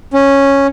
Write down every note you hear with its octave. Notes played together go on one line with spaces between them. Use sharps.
C#4